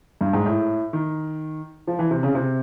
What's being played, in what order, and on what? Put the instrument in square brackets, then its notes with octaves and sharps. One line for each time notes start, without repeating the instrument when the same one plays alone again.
[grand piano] G2
G#2
A2
D#3
F3
E3
C3
C#3
C3